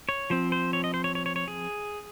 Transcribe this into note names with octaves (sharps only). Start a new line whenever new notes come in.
C#5
F3 C4 C5
C5
C#5
D#5
C5
C#5
C#5
C#5
C#5
G#4